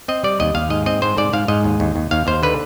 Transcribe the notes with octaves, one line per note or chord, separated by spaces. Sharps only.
C4 D#5
G3 D5
D#2 D#5
D#2 F5
G#2 D#5
C4 D#5
G#2 C5
G#2 D5
G#2 F5
G#2 D#5
D#2
D#2
D#2
D#2 F5
D#2 C5
D3 B4